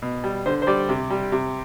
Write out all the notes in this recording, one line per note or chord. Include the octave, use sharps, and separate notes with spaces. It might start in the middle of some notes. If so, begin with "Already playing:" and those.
B2
G3
D3 C5
C5
G3 D5
C3
G3
C3